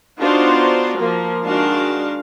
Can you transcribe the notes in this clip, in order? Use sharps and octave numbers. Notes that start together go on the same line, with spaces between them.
B3 D4 D#4 F4 F#4 C5
F3 A#3 A#4
D#3 G#3 D4 F#4 F5 A5